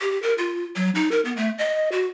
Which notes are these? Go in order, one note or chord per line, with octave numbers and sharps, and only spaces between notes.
G4
A#4
F4
F#3
D#4
A#4
B3
A3
D#5
F#4